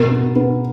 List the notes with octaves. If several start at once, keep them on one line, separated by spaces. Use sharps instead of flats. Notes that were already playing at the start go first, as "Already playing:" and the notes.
Already playing: B2 A#4
B3
B3